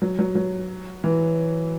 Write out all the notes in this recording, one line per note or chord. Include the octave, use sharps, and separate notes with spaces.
F#3
F#3
F#3
E3